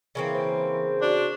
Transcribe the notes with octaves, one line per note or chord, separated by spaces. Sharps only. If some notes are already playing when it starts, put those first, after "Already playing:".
C#3 E3 A#3 C4
C5
D4 F#4